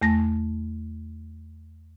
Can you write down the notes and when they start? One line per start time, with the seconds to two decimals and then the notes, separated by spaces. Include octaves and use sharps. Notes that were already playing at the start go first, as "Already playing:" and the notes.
0.02 E2 A3 A#6